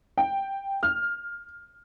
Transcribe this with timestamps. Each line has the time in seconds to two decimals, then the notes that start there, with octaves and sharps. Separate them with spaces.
0.18 G5
0.83 F6